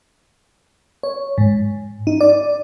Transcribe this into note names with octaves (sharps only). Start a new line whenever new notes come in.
C#5
G#2
D#4
D5